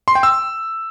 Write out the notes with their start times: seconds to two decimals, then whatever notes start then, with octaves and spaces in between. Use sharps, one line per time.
0.08 C6
0.15 G5
0.23 E6